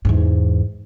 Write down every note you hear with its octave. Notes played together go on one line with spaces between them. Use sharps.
E2 G#2